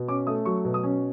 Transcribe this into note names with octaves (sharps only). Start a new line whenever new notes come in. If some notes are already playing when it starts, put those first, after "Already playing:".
Already playing: B2
C#4 D6
A3 D#6
F#3 C#6
B2
D#6
C#4